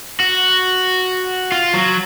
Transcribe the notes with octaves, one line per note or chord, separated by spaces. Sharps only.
F#4
F4
F#3